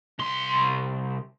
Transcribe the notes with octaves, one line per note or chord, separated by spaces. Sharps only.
C2 C6